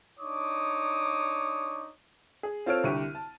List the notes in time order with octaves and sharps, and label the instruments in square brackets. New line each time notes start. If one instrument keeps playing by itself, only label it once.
[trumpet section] D4 D#4 C#5 D6 D#6
[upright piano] G#4
C4 F4 A4 C#5 F6 D7
C2 D3 G4 C#6 D#7
A5